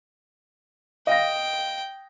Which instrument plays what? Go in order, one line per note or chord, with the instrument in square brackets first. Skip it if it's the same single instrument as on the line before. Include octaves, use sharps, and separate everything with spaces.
[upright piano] D#5 F5 A#6 [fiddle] G5